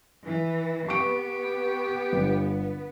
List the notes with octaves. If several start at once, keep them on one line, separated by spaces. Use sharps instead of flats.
E3
B3 G4 C#6 D7
G1